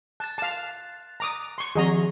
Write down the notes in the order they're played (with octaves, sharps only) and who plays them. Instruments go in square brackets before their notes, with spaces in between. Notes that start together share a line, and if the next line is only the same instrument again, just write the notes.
[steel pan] A5 [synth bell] F#6 A6
[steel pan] F5 A5
A#5 D6 D#6
C6 C#6
[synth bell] D#3 F3 C4 [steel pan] G#4 D#5 A#5